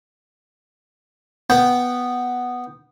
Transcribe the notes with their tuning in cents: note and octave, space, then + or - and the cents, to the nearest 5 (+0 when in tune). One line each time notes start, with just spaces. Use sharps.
B3 +0 G5 +0